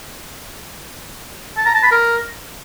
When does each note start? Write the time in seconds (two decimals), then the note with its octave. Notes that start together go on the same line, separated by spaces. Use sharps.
1.57 A5
1.66 A#5
1.74 A5
1.83 B5
1.92 A#4